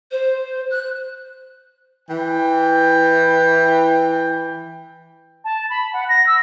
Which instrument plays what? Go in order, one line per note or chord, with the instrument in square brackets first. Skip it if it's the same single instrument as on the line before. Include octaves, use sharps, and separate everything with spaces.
[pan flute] C5
F#6
[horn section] E3 G5
[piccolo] A5
B5
F#5
A#6
E6